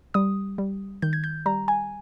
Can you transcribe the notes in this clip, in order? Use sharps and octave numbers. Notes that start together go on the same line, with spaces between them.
G3 D#6
G3
D#3 G6
G#6
G6
G3 A#5
G#5